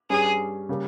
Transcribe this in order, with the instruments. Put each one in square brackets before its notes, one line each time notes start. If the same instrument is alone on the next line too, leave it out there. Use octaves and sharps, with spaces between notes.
[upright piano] G2 G3 C#4 [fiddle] G#4
[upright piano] C#3 G3 A#3